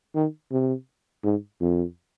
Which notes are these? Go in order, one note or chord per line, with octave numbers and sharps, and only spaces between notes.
D#3
C3
G#2
F2